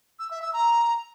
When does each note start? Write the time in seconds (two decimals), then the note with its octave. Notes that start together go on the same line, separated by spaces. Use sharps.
0.19 E6
0.31 E5
0.42 E6
0.53 A#5